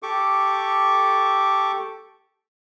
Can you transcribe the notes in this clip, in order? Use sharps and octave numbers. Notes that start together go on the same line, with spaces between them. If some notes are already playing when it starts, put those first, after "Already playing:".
G4 A4 C#6 D6